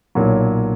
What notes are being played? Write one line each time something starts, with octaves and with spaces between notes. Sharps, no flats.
B1 A#2 F#3